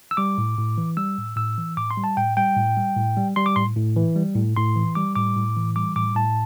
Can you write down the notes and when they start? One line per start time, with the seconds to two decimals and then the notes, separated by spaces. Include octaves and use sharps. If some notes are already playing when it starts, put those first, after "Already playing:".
0.11 E6
0.17 G3 D6
0.38 A2
0.58 A2
0.78 E3
0.97 G3 E6
1.18 A2
1.37 A2 E6
1.58 E3
1.77 A2 D6
1.91 C6
1.97 G3
2.04 A5
2.17 A2 G5
2.37 G3 G5
2.57 A2
2.77 G3
2.96 A2
3.17 G3
3.36 G3 C6
3.46 D6
3.56 A2 C6
3.76 A2
3.96 E3
4.16 G3
4.36 A2
4.56 A2 C6
4.76 E3
4.95 G3 D6
5.16 A2 D6
5.36 A2
5.56 E3
5.76 G3 D6
5.96 A2 D6
6.15 A2 A5